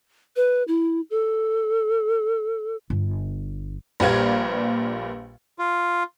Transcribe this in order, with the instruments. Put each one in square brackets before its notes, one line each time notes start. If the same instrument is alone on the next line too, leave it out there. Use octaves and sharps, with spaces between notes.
[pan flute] B4
E4
A4
[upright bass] G1
[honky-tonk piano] A#1 A#2 G3 B4 F5 G#6
[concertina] F4